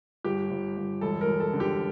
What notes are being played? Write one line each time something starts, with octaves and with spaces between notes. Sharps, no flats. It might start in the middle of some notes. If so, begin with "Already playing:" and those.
G1 G4
G1
G1
E1 A4
A#4
E1
A4
D3
G4